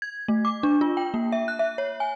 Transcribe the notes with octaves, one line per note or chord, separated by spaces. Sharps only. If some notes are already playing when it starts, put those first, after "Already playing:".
G#6
A3
D6
D4
F4
G5
A#3
E5
F#6
E5
C#5
G#5